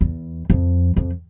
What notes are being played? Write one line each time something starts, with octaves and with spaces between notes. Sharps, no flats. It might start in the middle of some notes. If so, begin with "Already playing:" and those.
E2
F2
F2